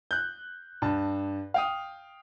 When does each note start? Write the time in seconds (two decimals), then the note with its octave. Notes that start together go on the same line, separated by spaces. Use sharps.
0.11 F#6 G6
0.82 G2 A5
1.54 F5 G5 D#6